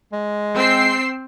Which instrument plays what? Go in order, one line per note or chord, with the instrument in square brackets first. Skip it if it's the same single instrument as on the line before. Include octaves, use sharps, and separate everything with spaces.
[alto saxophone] G#3
[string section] C4 E6 C7